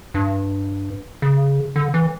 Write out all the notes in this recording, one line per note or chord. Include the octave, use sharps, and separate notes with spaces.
G2
C#3
D3
E3